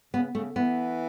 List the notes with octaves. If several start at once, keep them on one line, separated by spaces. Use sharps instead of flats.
C#3 B3
C#3 A3
E3 B3